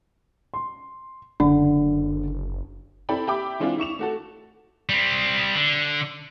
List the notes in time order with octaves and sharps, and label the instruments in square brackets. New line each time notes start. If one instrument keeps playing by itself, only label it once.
[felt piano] C6
[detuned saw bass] F#1 [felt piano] D3 [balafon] D4
[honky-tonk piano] C4 E4 A4 D5 G5 B5
G4 E5 G5 B5 D6
E3 G#3 C4 D4 E4 F4
E4 C#6 E7 F7
A3 F#4 A4
[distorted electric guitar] G3 C4
D3